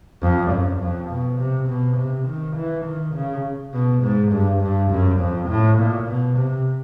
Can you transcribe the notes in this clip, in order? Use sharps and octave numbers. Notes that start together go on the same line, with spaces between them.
F2
F#2
F2
B2
C3
B2
C3
D#3
E3
D#3
C#3
B2
G#2
G2
G2
F#2
F2
A2
A#2
B2
C3